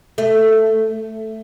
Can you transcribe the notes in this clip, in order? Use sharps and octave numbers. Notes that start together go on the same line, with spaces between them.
A3